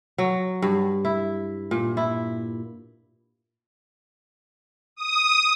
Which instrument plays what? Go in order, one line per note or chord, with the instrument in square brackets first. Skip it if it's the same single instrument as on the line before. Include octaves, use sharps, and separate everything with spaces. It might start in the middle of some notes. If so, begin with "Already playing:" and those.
[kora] F#3
G2
E4
A#2
E4
[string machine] D#6